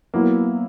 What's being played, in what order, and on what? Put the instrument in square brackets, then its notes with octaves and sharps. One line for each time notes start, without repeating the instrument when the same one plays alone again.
[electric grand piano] F#3 B3 E4 [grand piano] A#3